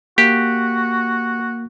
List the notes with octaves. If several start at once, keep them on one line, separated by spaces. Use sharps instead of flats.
A#3 F#4 G4